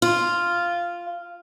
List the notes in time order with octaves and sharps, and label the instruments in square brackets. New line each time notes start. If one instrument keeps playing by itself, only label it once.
[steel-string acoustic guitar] F4